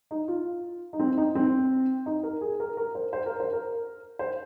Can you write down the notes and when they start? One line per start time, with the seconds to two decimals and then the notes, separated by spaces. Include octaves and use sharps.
0.11 D#4
0.28 F4
0.93 D#4
0.99 C4
1.18 D#4
1.35 C4
2.06 D#4
2.23 A#4
2.41 G#4
2.60 A#4
2.77 A#4
2.95 C5
3.13 C5
3.26 A#4
3.40 C5
3.53 A#4
4.19 C5